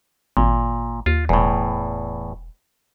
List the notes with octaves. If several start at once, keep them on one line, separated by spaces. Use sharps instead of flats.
G#1 A#2
D#2 F4
E1 E2 A2